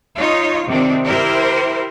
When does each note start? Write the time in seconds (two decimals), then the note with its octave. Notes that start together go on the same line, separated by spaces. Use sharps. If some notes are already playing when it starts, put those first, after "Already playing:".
0.18 D#4 F4 C#5
0.68 C3 D#3 C4 D4
1.06 E4 G4 A#4 C5